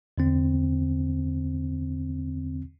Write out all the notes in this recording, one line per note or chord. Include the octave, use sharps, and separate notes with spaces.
E2 D3 C4